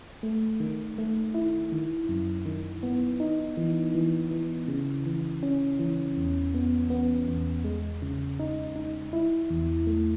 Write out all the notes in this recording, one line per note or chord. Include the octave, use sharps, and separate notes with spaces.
A3
D#3
A3
E4
D#3
F#2
D#3
B3
D#4
E3
E3
E3
C#3
E3
C#4
E3
E2
B3
B3
E2
G#3
C#3
D#4
D#4
E4
E2
A3